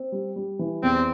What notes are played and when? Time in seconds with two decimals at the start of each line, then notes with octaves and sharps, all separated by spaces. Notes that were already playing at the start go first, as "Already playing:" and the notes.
Already playing: C4
0.12 G3
0.36 G3
0.59 E3
0.83 E2 C4